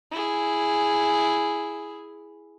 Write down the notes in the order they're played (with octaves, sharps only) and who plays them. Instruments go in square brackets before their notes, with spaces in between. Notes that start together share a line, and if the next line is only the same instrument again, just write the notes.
[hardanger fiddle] E4 G#4